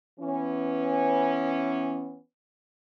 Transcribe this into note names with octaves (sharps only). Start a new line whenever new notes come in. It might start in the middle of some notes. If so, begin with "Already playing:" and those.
E3 B3 C#4